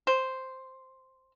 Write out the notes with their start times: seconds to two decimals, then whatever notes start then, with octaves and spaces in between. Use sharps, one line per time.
0.07 C5